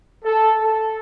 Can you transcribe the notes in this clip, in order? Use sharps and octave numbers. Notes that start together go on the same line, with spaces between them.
A4
A4